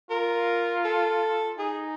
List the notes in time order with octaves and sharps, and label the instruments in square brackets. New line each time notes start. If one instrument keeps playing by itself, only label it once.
[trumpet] F4 [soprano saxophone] A#4
[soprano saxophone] A4
[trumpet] D#4 [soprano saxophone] G#4